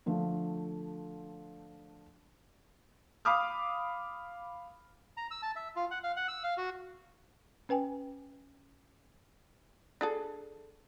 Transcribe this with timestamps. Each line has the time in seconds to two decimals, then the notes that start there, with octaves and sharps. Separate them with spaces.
0.06 D3 F3 A3
3.25 F5 B5 D6 D#6 F6
5.17 A#5
5.31 E6
5.42 A5
5.56 E5
5.76 F4
5.91 F#5
6.04 F5
6.17 F#5
6.28 E6
6.44 F5
6.57 F#4
7.69 C#4 B4 G5 G#5
10.01 D4 G#4 A4